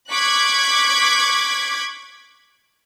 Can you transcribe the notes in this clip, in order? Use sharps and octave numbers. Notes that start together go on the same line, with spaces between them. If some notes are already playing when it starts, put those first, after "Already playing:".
C#6 D6 F#6 G#6 B6